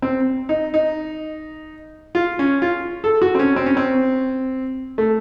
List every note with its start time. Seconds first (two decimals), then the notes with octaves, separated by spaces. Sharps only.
0.02 C4
0.49 D#4
0.74 D#4
2.15 F4
2.39 C#4
2.62 F4
3.04 A4
3.22 F#4
3.35 C4
3.39 C#4
3.56 C4
3.66 C#4
3.77 C4
4.98 A3